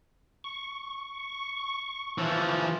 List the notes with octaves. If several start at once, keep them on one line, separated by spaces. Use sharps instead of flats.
C#6
E3 F3